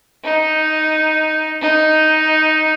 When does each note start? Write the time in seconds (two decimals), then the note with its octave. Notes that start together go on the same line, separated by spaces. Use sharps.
0.24 D#4
1.61 D#4